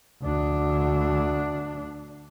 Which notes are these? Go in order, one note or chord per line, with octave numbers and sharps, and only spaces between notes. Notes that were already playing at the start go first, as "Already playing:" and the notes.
D2 D4